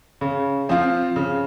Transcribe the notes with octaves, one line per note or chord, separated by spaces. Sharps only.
C#3
F3 C4 F4
C#3